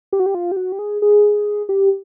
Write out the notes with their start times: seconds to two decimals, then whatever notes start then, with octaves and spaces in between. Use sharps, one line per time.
0.13 G4
0.20 F#4
0.26 G4
0.35 F4
0.52 G4
0.57 F#4
0.72 G4
0.79 G#4
1.02 G#4
1.69 G4